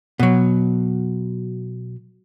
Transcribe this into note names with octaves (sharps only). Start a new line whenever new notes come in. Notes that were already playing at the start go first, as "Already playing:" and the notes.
B2 F#3